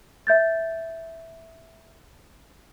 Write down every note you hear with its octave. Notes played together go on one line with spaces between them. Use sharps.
E5 G6 A6